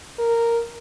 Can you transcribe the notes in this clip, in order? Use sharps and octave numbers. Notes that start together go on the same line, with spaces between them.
A#4